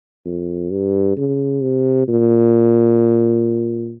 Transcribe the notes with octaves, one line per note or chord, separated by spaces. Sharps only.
F2
G2
C#3
C3
A#2